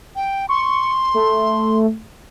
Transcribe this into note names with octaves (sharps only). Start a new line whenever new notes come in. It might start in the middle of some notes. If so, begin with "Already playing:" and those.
G5
C6 C#6
A3